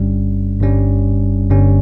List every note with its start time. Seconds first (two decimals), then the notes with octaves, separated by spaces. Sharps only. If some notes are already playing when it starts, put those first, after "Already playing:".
Already playing: G1 G2 G3 C#4
0.60 G1 G2 G3 C#4
1.49 G1 G2 G3 C#4